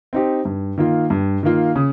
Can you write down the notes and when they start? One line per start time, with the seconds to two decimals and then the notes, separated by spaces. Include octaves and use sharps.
0.13 C4 D#4 G4
0.45 G2
0.78 D#3 A#3 F4
1.10 G2
1.43 D#3 A#3 F4
1.76 C#3